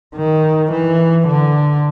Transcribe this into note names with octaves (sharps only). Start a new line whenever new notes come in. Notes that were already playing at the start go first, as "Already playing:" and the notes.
D#3
E3
D3